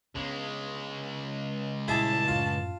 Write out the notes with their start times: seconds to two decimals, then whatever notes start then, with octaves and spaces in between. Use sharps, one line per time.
0.16 C#2 G#3 B3 D4
1.88 A#2 G3 E4 G#4 A5 D6
2.28 F#2 A2 F4